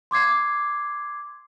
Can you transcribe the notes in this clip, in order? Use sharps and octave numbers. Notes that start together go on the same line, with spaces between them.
C6 D6 G#6 C7